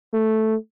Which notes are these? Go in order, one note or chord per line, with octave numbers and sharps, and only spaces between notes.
A3